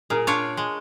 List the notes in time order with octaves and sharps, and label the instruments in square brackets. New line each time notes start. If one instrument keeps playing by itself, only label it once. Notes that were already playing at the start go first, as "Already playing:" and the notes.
[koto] A#2 [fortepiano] G#4 A#4
[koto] D4 F4 C#5
G#3